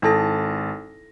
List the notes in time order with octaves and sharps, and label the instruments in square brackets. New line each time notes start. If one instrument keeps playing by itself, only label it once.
[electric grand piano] G#1 A5 A#6 [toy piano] D4 E4 A4